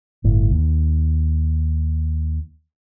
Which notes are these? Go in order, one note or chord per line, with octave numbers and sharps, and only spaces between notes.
G1 A2
D#2